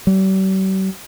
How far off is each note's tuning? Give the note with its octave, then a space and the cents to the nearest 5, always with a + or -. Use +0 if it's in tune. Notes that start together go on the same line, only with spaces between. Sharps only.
G3 -45